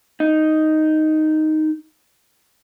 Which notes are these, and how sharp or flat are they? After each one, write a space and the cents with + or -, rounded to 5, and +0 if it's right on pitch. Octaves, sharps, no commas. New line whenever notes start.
D#4 +0